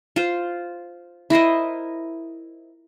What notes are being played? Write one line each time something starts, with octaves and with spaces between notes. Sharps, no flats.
F4 C5
E4 A#4 C5 D#5